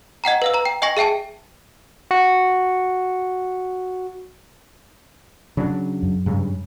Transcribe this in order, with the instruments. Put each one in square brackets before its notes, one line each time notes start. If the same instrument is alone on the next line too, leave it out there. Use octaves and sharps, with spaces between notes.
[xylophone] D#5 F#5 G5 A#5
B4 F5 E6
B4 A#5
G5
D#5 G5 G#5 C#6 A#6
G#4 E5 G5 A5 C#7
[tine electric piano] F#4 C#7
[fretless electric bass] C#3 F#3 D4
[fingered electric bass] F#2
[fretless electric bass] G2 C#3